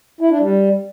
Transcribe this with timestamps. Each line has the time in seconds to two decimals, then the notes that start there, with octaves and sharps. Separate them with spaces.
0.21 E4
0.31 D4
0.41 G3